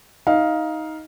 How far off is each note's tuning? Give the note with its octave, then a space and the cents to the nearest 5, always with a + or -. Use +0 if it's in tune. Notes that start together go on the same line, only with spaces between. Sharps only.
D#4 +15 F5 +0